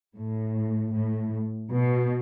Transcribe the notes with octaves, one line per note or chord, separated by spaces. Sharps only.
A2
A2
B2